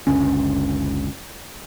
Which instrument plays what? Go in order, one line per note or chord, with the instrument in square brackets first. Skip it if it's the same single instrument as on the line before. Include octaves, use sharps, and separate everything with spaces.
[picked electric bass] F#1 C#2 D3 C#4